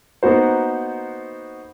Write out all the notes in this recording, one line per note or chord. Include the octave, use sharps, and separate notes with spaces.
A#3 B3 D#4 F#4 C5